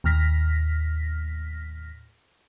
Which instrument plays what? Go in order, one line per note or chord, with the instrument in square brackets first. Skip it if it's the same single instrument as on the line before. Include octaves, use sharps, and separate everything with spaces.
[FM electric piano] D#2 A2 F6 A#6 B6